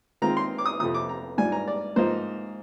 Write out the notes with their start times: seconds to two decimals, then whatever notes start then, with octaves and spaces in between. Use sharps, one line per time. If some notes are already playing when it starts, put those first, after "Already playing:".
0.22 D#3 G#3 C4 F4 A#5
0.37 C6
0.58 D6
0.66 D#6
0.79 F2 C3 F3 D#6
0.94 D6
1.09 A#5
1.38 G#2 G3 D4 F4 G#5
1.52 A#5
1.67 D5
1.96 G#2 F3 A#3 D#4 C5